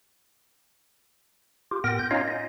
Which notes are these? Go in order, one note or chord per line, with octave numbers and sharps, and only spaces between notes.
F4 G4
A2 B3 A#4 G5 A#6
G6
C#4 D#4 F4 C#5 D#5 F5
D#5